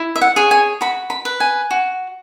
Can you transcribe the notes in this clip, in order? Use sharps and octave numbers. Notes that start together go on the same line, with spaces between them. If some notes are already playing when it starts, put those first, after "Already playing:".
Already playing: E4
E5
F#5
G#4 C#5
G#5
F#4 B5
B5
B4
G#5
F#4